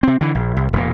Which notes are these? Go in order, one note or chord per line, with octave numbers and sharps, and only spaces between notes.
C3 C4
D3 E3
A#1
C2
E1 A#2